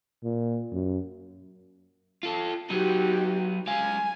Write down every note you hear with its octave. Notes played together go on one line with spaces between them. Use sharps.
A#2
F#2
F4 A4
F#3 D#4 F#4 G4
G#3 F5 G#5